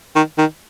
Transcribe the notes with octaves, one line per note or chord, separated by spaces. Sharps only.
D#3
D#3